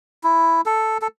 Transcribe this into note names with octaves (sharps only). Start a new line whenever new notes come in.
E4
A4
A4